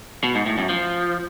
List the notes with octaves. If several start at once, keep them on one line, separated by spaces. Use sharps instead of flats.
B2
G#2
A2
F#2
F3